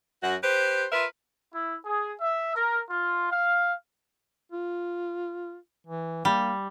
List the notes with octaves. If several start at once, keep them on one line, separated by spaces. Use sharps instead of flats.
F#2 F#4
G4 B4 C5
F4 A#4 B4 E5
E4
G#4
E5
A#4
F4
F5
F4
E3
G3 A#3